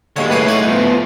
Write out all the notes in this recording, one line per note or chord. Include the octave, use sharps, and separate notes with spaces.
D#2 D3 G#3 C#5
A2 A#3 G#4 B4 C#5
A2 D#4 F#5 G#5 C#6
F3 B3